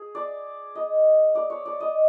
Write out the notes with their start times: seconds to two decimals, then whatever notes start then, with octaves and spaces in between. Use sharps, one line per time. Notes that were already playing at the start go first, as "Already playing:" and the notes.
Already playing: G#4
0.15 D5
0.75 D#5
1.35 D5
1.50 C#5
1.65 D5
1.80 D#5